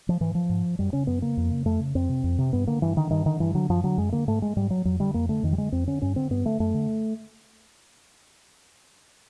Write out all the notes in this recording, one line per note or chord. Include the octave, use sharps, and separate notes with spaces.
F3
G#2 E3
F3
G#2
F#2 G3
C#3 C#4
F#2 B3
C#3 A#3
F2
C#3
F2 A3
C#3
F2 C4
C3
F2
C3
G2 B3
D3 A#3
G2 E3
D3 D#3
G2 D#3
D3 D#3
G2 E3
D3 F#3
F#2 F3
D3 F#3
F#2 G#3
D3 A#3
G#2 A3
G#3
G#2 G3
F#3
F2 F#3
D3 G3
F2 A#3
D3 A3
F2 D#3
G3
D3 G#3
F2 C4
D3 C#4
G2 C#4
D3 C4
G2 B3
D3 A3
F#2 A3
D3